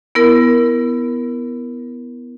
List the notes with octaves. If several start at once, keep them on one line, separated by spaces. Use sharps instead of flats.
B3 E4 A#4